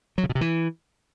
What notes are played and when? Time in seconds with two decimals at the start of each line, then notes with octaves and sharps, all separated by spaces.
0.18 F#3
0.24 C#3
0.29 B2
0.35 C3
0.41 E3